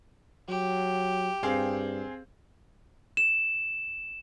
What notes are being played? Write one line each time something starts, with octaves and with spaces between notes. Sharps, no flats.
F#3 G4
G2 C4 G#4 F5
E7